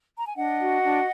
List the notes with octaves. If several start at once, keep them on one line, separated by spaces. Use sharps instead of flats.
A#5
G#5
D4 D#5 F#5
F#4
D4